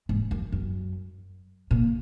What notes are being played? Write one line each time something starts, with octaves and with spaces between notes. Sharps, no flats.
G#2
F#2
F#2
A#2